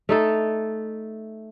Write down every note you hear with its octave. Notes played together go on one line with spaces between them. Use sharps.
A3 D#4 A4